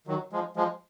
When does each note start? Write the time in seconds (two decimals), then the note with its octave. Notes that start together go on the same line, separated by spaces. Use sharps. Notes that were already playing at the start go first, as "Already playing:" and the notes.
0.07 D#3 F#3
0.32 F3 G#3
0.56 F3 G#3